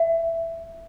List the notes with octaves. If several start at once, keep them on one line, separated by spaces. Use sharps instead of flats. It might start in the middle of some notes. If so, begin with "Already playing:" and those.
Already playing: E5